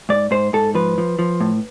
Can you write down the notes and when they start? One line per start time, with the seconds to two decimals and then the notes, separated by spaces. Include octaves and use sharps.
0.09 G#2 D5
0.31 G#2 C5
0.53 G#2 A4
0.75 F3 B4
0.98 F3
1.19 F3
1.40 A2